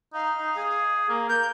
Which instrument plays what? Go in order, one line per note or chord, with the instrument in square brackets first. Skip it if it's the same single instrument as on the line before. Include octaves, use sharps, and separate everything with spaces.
[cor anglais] D#4 [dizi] F5
[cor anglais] D#4
G#4
A#3
[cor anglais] A#4 [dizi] G6